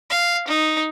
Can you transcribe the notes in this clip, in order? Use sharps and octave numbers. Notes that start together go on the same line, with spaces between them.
F5
D#4